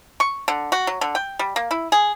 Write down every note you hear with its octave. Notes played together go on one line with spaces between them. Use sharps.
C#6
D3
F#4
F#3
D3
G5
G3
A#3
E4
G#4